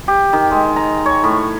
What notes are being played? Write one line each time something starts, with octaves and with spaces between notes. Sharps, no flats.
G4
D#3
G#3
A#5
C#5
A2